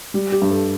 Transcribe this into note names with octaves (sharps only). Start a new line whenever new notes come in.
G3
G4
G2
A4